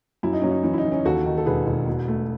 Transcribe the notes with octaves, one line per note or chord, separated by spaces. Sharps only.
F#2 E4
D#4
F#2 C#4
D#4
E3 C#4
E4
D#4
E3
C#4
D#2 F#4 A4
D#3
A4
E1 G#4 B4
E1
B2
A3